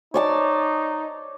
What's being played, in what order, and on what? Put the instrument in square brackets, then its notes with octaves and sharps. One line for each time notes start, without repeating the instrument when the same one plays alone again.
[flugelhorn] D#4 [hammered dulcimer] C#5 D5 A5